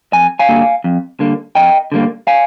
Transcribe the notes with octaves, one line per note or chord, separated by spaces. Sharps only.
F2 G#5
F5 G#5
D3 G3 A#3
F2
D3 G3 A#3
F2 D#5 G5
D3 G3 A#3
F5 G#5